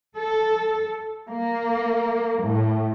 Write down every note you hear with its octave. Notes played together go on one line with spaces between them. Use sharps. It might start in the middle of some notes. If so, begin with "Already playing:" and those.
A4
A#3
A2